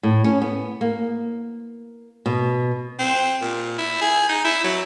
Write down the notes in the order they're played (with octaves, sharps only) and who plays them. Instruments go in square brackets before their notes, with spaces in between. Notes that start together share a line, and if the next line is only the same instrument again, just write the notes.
[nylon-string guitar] A2
C#4
B3
A#3
B2
[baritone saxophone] C4
A#2
E4
G#4
D#4
E4
F#3